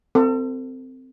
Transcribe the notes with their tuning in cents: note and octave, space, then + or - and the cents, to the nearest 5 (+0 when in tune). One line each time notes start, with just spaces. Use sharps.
C4 -15 A4 +40